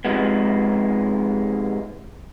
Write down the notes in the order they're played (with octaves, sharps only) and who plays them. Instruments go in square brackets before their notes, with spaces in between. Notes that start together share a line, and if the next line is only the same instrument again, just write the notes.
[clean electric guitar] G#2 C3 E3 F3 G#3 B3